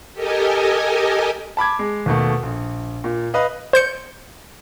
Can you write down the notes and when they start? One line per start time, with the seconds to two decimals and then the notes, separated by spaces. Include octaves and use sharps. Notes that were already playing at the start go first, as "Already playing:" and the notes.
0.14 G4 A4 A#4 D#5 G#5
1.57 A5 B5 D6 G#6
1.79 G#3
2.06 D#2 B2 A3
2.43 A#1
3.04 A#2
3.34 B4 D#5 F5
3.73 C5 G6 C#7